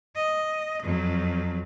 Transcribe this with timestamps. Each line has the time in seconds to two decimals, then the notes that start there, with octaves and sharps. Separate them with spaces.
0.15 D#5
0.82 F2 F#3